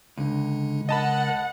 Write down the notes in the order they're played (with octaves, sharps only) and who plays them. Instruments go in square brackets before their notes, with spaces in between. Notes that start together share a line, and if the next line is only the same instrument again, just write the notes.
[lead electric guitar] C#2 [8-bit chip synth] D3 D4
[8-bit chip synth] A#4 A6 [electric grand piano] D#5 A5 B5 [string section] F#5